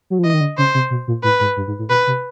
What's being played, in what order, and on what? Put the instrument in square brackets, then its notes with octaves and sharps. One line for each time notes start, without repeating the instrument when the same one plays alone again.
[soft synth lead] F#3
F3
[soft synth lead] E3 [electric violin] D#5
[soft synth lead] D#3
D3
[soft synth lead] C#3 [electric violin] C5
[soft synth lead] C3
B2
A#2
[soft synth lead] A2 [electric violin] B4
[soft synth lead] G#2
G2
G#2
A2
[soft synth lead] B2 [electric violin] B4
[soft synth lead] C3